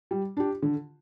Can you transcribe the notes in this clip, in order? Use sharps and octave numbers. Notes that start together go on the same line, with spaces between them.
G3
D4 G4
D3